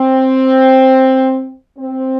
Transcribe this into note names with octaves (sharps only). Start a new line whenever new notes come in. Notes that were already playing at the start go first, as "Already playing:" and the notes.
Already playing: C4
C4